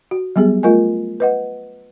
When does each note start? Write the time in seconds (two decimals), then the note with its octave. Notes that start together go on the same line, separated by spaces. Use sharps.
0.11 F#4
0.36 F#3 G3 B3 G4 G#4
0.63 A3 F4 A#4 D#5 G#5
1.20 B4 D#5 F#5